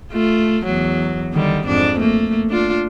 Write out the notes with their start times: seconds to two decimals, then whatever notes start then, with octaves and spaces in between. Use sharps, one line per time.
0.13 A3 F4
0.65 E2 F#3
1.33 D3 D#3 G3
1.67 F2 G#2 D4
1.99 A3 A#3
2.50 D4 F4